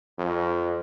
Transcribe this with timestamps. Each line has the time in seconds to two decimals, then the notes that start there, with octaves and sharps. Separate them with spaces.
0.18 F2